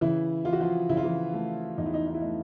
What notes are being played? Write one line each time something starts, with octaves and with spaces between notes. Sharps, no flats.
C#3 E3 E4
E3 F4
F#4
F3 F4
C#3 E4
F4
E3 E4
A3
E2 D#4
E4
D#4
D#4
E4
A3 D#4